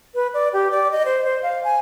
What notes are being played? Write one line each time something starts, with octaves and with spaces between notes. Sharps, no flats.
B4
D5
G4
D5
D#5
C5
C5
F5
G#5